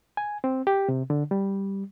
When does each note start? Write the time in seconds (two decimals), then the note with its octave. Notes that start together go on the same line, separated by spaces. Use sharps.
0.17 G#5
0.44 C4
0.67 G4
0.89 C3
1.10 D3
1.31 G3